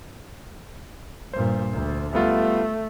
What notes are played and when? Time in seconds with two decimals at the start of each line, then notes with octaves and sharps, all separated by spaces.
1.33 G2 A#2 C5
1.72 D2
2.14 G3 A3 B3 F4